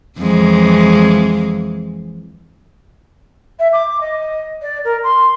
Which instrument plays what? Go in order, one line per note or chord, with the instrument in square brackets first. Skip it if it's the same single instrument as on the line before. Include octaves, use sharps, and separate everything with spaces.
[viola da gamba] F2 E3 G#3
[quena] E5
D6
D#5
D5
A#4
C6